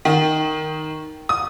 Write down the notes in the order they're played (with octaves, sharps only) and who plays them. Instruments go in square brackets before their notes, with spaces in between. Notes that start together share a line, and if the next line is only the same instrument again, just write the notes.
[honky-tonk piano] D#3
D#6